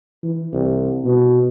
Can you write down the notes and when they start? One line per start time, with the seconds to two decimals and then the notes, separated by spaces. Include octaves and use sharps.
0.24 E3
0.53 C2
1.05 B2